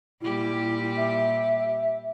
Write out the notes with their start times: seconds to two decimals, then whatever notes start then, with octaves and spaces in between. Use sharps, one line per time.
0.22 A#2 G3 E4 G4
0.97 E5